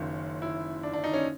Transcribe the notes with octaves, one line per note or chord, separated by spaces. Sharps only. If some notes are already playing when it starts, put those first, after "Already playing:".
Already playing: F#1 F#2 D#3 F4
E4
D4
D4
D#4
C#4